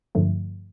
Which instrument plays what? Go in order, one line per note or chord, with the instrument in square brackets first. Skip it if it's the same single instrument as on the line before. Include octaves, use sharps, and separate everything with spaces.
[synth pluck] G2 D3 F3 A3